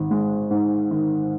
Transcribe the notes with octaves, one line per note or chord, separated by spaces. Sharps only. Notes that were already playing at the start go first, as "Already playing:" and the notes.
Already playing: G#1
G#3
G#2
D#3